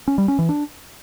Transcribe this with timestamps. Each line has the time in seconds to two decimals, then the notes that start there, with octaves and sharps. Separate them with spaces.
0.08 C#4
0.18 G3
0.28 C#4
0.39 E3
0.49 D4